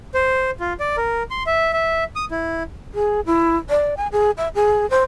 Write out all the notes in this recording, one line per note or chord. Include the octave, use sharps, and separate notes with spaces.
C5
F4
D5
A#4
C6
E5
E5
D#6
E4
G#4
E4
D5
G#5
G#4
E5
G#4
C5